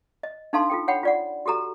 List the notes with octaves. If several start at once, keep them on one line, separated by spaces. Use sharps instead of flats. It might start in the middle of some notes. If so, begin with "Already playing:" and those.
D#5
D4 D#4 A4 F5 A5 C6
F4 A4 G5
C#5 F#5 G5 B5
F4 D5 F#5
F#4 G4 A4 A#5